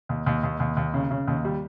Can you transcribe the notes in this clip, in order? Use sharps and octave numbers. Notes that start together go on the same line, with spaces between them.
D#2
D#2
D#2
D#2
D#2
C#3
C#3
D#2
G3